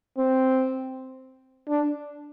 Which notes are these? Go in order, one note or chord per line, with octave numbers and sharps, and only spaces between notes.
C4
D4